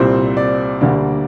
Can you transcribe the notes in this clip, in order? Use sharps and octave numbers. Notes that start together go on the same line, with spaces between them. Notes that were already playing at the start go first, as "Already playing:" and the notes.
Already playing: C2 A#2 G3 C4 C5
D5
D2 D3 G3 A#3 D4